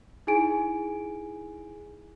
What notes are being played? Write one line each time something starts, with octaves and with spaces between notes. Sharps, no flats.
D#4 E4 G#4 G#5 D7